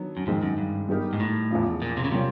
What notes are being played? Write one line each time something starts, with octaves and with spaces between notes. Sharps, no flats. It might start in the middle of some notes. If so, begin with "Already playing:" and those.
Already playing: D#3 F#3 B3 D4
F#2
F2 G#2 D#3 G#3 C4
F#2
G2
G3 B3 D#4 G4 A#4
G#2
A2
E2 C#3 F3
A#2
C3
C#3
C3 G3 A#3 C#4 F4